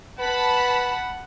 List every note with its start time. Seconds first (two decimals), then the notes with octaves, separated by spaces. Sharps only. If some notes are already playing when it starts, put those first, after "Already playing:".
0.20 B4 F#5 A5 B5